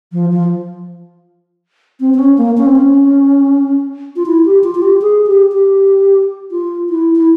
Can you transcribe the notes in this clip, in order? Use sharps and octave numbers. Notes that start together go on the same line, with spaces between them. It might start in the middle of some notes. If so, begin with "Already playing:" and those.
F3
F3
C4
C4
C#4
A#3
C#4
C4
C#4
F4
E4
G4
F4
F4
G4
G#4
G4
G4
F4
E4
E4